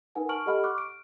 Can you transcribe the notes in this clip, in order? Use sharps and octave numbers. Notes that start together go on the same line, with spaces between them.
D#4 A#4 B4 F#5 G#5
A5 C#6 F6 D7 F#7
G4 A4 D#5 F#5 B5 F6
C#6 D6 F6 F#6
D7